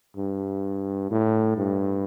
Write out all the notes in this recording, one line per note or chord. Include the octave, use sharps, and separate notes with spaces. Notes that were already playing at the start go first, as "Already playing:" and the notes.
G2
A2
G2